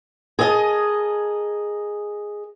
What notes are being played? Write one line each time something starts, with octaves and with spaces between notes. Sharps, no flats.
G#4 A#4 D#5 G5 A5